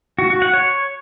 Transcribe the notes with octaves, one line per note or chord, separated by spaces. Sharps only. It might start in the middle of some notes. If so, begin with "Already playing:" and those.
F#4
F#4
F#5
C#5